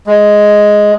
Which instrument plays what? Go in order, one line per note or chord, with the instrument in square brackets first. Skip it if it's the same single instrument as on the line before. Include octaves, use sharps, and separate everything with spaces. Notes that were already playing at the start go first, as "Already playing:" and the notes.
[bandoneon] G#3